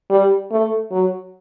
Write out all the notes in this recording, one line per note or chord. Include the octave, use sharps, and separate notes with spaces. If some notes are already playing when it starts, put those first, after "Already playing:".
G3
A3
F#3